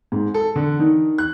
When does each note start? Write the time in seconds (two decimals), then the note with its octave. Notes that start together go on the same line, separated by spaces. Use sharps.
0.12 G#2
0.34 A4
0.56 D3
0.79 D#3
1.18 F#6